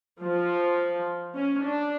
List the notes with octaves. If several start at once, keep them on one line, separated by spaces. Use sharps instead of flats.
F3
C#4
D4